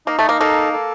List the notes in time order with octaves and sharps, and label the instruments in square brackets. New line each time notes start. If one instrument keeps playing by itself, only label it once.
[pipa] A#3 [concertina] D#4
[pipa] A3
A#3
[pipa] A#3 [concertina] A4
[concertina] A4